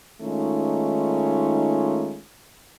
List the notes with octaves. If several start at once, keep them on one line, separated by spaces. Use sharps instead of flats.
D#3 G#3 A3 C#4 D#4 F4